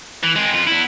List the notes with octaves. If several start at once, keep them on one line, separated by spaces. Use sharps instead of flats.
E3
G#3 C4
F2 F4
B3 E4